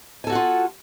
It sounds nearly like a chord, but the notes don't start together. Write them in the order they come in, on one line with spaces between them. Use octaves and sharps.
G#5 A4 F#4 F#5 F4